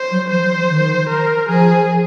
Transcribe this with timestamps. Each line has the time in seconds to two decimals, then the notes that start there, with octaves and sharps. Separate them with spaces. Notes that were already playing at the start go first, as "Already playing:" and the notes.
Already playing: C5
0.11 F#3
0.30 F3 C5
0.43 F#3
0.57 F3
0.69 D#3
1.09 A#4
1.48 F3 G#4